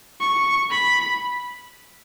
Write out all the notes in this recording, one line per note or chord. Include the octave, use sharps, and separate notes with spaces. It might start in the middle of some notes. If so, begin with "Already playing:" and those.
C#6
B5